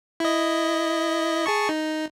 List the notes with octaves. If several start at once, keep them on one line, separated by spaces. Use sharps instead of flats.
E4 D#5
G#4 A5 C#6
D#4